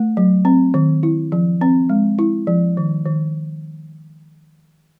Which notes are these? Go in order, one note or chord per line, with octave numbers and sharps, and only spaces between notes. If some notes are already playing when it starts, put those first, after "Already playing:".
Already playing: A3
F#3
C4
D#3
E4
F3
C4
G#3
E4
F3
D#3
D#3